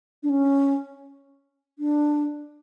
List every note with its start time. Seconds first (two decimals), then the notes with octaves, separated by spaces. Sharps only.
0.23 D4
0.29 C#4
1.79 D4